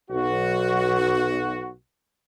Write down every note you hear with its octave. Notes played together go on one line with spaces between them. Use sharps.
B1 F#4